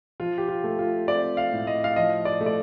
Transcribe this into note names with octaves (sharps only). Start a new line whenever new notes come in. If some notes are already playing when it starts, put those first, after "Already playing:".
F3 F4
G4
F4
A3
F4
C4 D5
F5
A2
D#5
F5
F3 D#5
D5
A3
D5